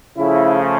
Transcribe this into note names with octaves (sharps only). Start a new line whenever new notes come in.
C#3 F3 A3 E4